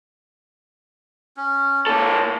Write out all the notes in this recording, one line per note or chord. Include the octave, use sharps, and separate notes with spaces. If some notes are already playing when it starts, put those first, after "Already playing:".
C#4
A#2 A#3 A4